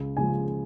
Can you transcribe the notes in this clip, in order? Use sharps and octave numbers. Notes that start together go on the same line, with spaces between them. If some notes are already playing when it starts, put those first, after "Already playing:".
Already playing: C#2
C#3 F3 G#3 G#5